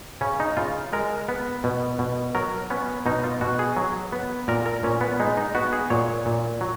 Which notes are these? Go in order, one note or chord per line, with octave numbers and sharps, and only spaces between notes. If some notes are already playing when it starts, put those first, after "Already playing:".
C#3 C#4
D#4
C#3 F4
G#3 A#4
B3
B2
B2
F#3 A#4
B3 C#4
B2 D#4
F4
B2 F#4
G#4
F#3
B3
A#2 A#4
A#4
A#2 C#4
B3
G#3 D#4
D#4
B3 F#4
G#4
A#2 C#5
A#2
F#3